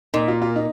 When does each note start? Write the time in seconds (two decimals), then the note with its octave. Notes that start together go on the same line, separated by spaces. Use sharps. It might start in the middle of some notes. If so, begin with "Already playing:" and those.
0.14 A#2 D#4
0.28 F4
0.42 F4
0.56 D#4